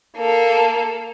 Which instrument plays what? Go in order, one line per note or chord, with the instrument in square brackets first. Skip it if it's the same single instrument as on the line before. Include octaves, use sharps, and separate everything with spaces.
[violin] A#3 A4